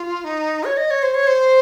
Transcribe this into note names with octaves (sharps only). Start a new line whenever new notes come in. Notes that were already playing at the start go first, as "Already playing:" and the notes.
Already playing: F4
D#4
C#5
D#5
C#5
C5
C#5
C5